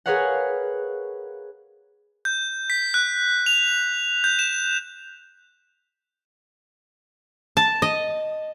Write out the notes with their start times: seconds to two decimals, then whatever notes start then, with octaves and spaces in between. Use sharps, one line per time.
0.06 G#4 A#4 B4 C#5 F5 F#5
2.25 G6
2.70 B6
2.94 F#6
3.46 F7
4.24 G6
4.39 E7
7.57 A5
7.82 D#5